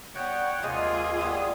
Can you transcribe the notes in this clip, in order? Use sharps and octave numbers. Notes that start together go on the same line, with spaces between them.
G3 B3 F#4 C#5 F#5 G5
D#2 C3 G#3 F4 G#4 D#6
G3 B3 G4